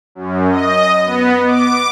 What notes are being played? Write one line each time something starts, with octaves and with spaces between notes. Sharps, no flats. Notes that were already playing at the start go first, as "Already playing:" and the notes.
F#2
D#5
B3
D6